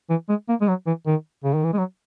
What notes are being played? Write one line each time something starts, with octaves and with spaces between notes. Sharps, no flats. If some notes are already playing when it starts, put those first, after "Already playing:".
E3
G#3
A#3
G#3
F#3
E3
D#3
C#3
D#3
E3
G#3
F#3